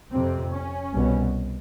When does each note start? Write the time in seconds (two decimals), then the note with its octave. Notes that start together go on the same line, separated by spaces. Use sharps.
0.11 F2 C3 C4
0.52 C#4
0.92 C2 B2